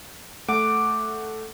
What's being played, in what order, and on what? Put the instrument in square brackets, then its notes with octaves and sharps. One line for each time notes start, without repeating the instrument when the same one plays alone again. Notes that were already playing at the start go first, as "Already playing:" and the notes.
[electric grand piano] A3 F#5 [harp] D6